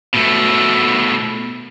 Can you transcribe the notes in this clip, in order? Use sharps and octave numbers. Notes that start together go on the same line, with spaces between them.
B2 A3